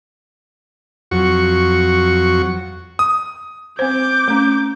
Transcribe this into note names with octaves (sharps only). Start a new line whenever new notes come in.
F2 F#3 F#4 C#6
D#6
C4 C5 D6 G6
A3 C#4